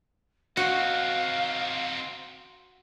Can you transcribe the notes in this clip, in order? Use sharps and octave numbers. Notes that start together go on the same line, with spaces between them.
C4 D#4 F#4 F5